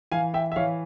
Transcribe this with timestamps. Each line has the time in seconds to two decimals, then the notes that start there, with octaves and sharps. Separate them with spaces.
0.12 E3 F5 G#5
0.34 E5 G5
0.52 E5
0.56 E3 C#5 F5